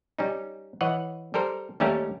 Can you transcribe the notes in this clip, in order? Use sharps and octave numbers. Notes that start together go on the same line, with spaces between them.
G3 C#4 D#4
E3 C#5 D#5 F#5
G3 A4 A#4 C5
D#2 G3 A3 C#4 G4 A#4